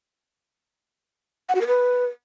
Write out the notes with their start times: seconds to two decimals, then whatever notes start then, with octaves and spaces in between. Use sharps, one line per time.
1.49 F#5
1.55 F#4
1.61 A#4
1.67 B4